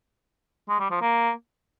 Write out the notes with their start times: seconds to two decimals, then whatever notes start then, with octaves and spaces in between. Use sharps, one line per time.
0.69 G#3
0.80 G3
0.91 F3
1.02 A#3